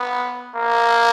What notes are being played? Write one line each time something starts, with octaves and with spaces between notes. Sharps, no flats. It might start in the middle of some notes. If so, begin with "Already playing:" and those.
Already playing: B3
A#3